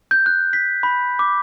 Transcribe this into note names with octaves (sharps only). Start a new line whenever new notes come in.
G6
F#6
B6
B5
D6